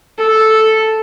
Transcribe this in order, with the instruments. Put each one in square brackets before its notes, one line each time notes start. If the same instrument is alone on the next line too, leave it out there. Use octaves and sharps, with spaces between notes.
[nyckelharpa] A4